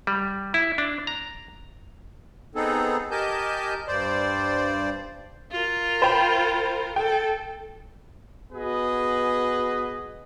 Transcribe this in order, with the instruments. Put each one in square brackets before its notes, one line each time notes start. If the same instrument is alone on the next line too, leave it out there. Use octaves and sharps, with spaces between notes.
[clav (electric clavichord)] G3
E4
D4
A#5
[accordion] B3 C4 D#4 G#4 A4
G4 A#4 D#5 G#5 A5 G6
G2 C5 D5
[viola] F4 A#4
[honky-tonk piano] C5 G5 B5
[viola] A4 [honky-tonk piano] G5
[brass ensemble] B3 F#4 G#4 B4 D#5